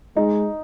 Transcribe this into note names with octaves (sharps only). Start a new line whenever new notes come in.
G#3 D#4